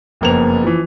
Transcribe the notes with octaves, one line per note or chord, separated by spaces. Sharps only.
F#1 F2 A#3 B3 F7
E3 F3